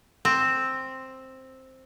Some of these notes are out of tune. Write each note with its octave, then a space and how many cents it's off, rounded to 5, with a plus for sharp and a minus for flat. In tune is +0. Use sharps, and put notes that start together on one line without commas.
C4 +5